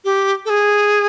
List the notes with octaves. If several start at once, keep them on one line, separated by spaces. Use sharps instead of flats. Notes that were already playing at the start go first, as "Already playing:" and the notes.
G4
A4
G#4